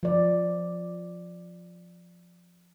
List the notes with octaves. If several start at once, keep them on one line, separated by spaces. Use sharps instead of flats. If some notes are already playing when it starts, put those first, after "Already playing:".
F3 D5